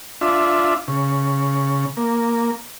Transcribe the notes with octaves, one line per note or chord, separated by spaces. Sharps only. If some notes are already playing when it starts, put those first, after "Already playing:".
D4 F4 E5
C#3
A#3